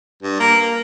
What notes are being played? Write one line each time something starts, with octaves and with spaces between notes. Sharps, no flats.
G2
A#3
A#3